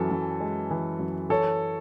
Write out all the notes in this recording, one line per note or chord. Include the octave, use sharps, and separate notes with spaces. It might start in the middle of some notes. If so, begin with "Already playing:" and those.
Already playing: F#2 E3 A4
F#2
G#3
E3
F#2
E3 A4 C#5